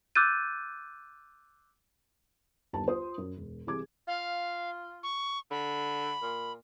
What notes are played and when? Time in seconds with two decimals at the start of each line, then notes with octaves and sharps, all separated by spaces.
0.15 D6 E6 F#6 G6 A6 D#7
2.73 G1 D#2 A5
2.87 F4 C5 C6 D#6
3.18 F#2
3.37 E1
3.67 C2 E3 G3 G#4 D6 G#6
4.07 F4 F5
5.03 C#6
5.51 D3 B5
6.22 A#2